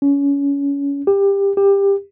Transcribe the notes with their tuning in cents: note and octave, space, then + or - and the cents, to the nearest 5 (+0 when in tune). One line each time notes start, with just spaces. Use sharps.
C#4 +25
G4 +20
G4 +20